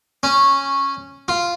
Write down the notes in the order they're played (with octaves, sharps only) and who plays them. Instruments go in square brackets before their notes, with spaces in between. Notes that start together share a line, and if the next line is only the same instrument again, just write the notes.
[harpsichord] C#4
F4